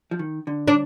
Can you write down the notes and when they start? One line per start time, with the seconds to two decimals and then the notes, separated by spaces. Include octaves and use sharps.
0.11 F3
0.19 D#3
0.47 D3
0.68 D4